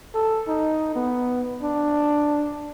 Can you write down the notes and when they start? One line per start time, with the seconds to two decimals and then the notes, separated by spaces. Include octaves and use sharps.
0.15 A4
0.48 D#4
0.96 B3
1.62 D4